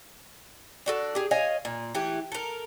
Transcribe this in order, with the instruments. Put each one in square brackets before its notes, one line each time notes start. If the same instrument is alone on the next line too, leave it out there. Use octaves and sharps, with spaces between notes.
[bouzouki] D4 F#4 A4
G4 G#4
C#5 D#5 F5 G#5
A#2
E3 A3 G4
A4 A#4